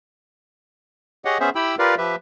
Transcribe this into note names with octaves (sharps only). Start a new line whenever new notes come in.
G4 G#4 C#5 D#5 F#5
B3 C#4 G#4 C5 E5
E4 G4 G5 B5 E6
F4 G4 A#4 B4 D5 F5
F3 G4 B4 E5